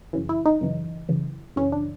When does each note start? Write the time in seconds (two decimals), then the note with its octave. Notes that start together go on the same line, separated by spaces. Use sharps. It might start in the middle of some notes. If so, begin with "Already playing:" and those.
0.13 F#2 C#3 E3
0.29 E4
0.45 D#4
0.61 F#2 C#3 E3
1.09 F#2 C#3 E3
1.56 F#2 C#3 E3 C#4
1.72 D4